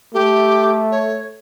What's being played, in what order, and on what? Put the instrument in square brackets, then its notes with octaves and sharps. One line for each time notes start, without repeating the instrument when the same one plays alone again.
[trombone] A3 [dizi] G4
[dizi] C#5